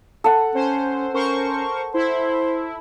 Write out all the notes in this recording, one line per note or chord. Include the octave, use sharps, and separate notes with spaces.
A4 F#5
C#4 C5
C#4 A#4 C5 C#6
E4 C5